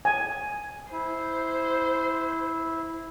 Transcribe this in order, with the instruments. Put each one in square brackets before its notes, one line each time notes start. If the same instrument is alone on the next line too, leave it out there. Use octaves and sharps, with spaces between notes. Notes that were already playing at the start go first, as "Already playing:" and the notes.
[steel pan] G#5
[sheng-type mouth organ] E4 [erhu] C5